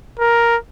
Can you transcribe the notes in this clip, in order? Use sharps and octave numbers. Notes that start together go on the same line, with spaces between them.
A#4